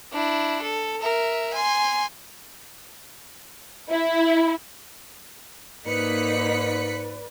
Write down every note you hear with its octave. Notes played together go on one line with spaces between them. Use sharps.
D4 E4
A4
A#4 E5
G#5 C6
E4
G#2 A#3 D#4 B4 D5 F#6 B6 C#7